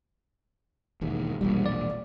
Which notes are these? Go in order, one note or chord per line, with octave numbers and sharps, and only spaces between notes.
E1 D#2 G#2
E1 A#1 G3
D5